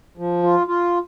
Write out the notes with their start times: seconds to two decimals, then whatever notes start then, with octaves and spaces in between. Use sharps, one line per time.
0.17 F3
0.43 F4
0.67 F4